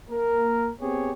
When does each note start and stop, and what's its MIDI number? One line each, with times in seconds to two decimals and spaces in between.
0.10 0.69 58
0.10 0.69 70
0.81 1.10 59
0.81 1.10 60
0.81 1.10 67
0.81 1.10 68
0.81 1.10 73